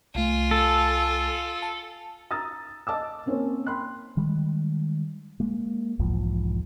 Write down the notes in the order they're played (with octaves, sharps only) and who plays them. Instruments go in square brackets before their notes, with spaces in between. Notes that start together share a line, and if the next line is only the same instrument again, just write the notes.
[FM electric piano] C2 A3 [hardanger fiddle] F4 G#5
[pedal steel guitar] A4
[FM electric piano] A5
[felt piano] A#5 D#6 E6 A6
D#5 A5 D6 E6
A#3 C4 C#4 A#4 C5 C#5
G5 B5 C6 F#6
[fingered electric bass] D#3 G3 G#3
G#3 A#3
B1 E2 G#2 F3